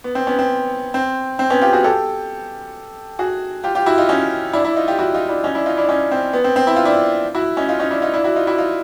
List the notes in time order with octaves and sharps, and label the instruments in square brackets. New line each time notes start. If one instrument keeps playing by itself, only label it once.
[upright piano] B3
C4
B3 C#4
C4
C4
C4
B3 C#4
F4 G4
F#4 G#4
G4 A4
F#4 G#4
F4 G4
F4 G4
E4 F#4
D#4 F4
C#4 D#4
D4 E4
D4 E4
D#4 F4
F4 G4
E4 F#4
D#4 F4
D4 E4
C#4 D#4
D4 E4
D#4 F4
D4 E4
C#4 D#4
C4
B3
C4
C4
E4
F4
D4 E4
E4 F#4
C#4 D#4
D#4 F4
C#4 D#4
D4 E4
D#4 F4
D4 E4
E4 F#4
D#4 F4
E4 F#4
D#4 F4